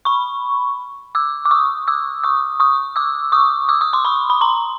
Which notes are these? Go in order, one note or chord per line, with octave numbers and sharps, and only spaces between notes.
B5 C#6
D6 E6
D6
C#6 D#6
D6 E6
C#6 D#6
C#6 D#6
D6 E6
C#6 D#6
D6 E6
C#6 D#6
C6 D6
B5 C#6
B5
A#5 C6